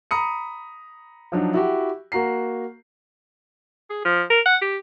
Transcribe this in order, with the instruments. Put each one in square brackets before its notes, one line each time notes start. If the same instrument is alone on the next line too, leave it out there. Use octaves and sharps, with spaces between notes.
[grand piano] A#5 B5 D#6 C#7
F3 F#3 D4 D#4
E4 F#4 G4
A#3 F#4 A#5 C7
[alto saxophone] G#4
F3
A#4
F#5
G4